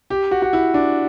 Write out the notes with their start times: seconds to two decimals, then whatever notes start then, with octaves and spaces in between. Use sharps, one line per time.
0.10 G4
0.31 F#4
0.42 F#4
0.53 E4
0.74 D4